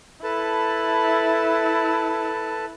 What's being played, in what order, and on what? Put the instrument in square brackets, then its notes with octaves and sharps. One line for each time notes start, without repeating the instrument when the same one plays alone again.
[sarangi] E4 [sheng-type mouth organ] A4 B4 A5